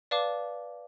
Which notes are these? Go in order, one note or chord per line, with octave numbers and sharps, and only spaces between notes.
B4 D5 F5 A5 D6